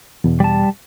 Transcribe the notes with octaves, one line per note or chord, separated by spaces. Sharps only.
E2 B2
G3 A5